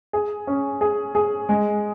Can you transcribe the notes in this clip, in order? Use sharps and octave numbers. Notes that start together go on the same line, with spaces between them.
G#4
C#4
G#4
G#4
G#3